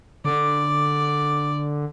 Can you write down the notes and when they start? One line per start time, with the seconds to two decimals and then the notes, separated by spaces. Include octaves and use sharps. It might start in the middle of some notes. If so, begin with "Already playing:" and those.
0.25 D3 D5